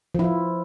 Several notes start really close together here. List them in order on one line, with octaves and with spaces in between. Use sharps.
F3 E4 F4